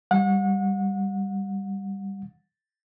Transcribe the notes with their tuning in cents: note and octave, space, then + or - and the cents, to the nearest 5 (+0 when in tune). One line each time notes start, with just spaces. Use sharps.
G3 +5 F#5 -35